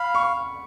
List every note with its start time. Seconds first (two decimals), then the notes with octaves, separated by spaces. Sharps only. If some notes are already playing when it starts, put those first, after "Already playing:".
Already playing: F5 B5
0.15 C#6